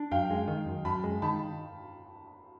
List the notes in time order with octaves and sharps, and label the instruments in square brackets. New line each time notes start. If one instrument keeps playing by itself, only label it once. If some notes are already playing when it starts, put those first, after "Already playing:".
Already playing: [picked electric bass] D4
[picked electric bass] F#2 [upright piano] F5 G5
[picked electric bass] G#3
D#3
F#2
[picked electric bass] F#2 [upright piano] A5 B5
[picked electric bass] G#3
[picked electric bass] D#3 [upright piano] A5 B5